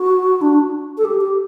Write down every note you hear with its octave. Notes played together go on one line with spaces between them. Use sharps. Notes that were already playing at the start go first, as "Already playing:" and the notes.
Already playing: F#4
D4
A4
G4
G4